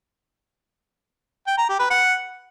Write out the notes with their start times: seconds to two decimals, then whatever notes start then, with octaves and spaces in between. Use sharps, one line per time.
1.47 G5
1.58 A#5
1.69 G4
1.79 B4
1.90 F#5